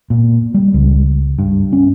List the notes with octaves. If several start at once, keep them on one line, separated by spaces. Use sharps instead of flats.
A#2
G3
C#2
G2
C#4